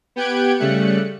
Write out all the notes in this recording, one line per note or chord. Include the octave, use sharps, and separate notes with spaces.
B3 G4 G5 F#6 G#6 D7
C#3 G3 A3 F#6 C#7